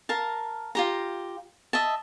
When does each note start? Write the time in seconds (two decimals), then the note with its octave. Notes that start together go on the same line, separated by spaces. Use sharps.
0.09 A#4 F5 A5
0.75 F4 G4 A#5
1.73 D#5 E5 A5